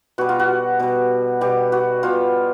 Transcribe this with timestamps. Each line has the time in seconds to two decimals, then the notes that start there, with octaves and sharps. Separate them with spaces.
0.18 B2 G3 F#4
0.29 F4
0.40 F#4
0.80 B2 G3
1.41 B2 G3 G4
1.72 F#4
2.03 B2 G3 F4